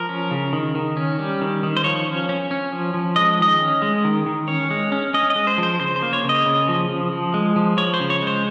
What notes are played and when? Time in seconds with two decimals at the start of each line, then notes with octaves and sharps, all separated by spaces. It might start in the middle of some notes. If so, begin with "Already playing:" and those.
Already playing: F3 A#4
0.09 C#4
0.31 C#3
0.53 D#3
0.75 D#3
0.97 C#4
1.19 G3
1.41 D#3
1.63 D#3
1.77 C5
1.84 F3 C#5
2.07 C#4
2.29 C#4
2.51 C#4
2.72 F3
2.94 F3
3.16 G#3 D#5
3.39 D#3 D#5
3.60 C#4
3.82 G#3
4.04 D#3
4.26 D#3
4.48 C#4 C#5
4.71 G#3
4.92 C#4
5.14 C#4 D#5
5.30 D#5
5.36 G#3
5.47 C5
5.58 F3
5.63 C5
5.80 C#3 C5
5.96 C5
6.02 A#3
6.13 C#5
6.24 C#3 D#5
6.46 C#3
6.68 F3
6.89 F3
7.12 F3
7.34 G#3
7.56 F3
7.77 F3 C#5
7.94 C5
8.00 C#3
8.10 C#5
8.22 G#3 C5